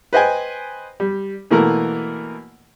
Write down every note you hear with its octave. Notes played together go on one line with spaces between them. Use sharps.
B4 C5 D#5 G5 G#5
G3
B2 E3 A3 A#3 E4 A#4